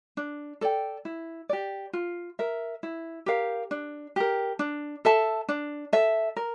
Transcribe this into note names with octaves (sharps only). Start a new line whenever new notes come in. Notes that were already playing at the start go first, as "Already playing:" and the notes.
D4
A4 D5 G5
E4
G4 D5
F4
A#4 E5
E4
G4 A#4 F5
D4
G4 A#4
D4
A4 E5 A5
D4
A4 E5
A#4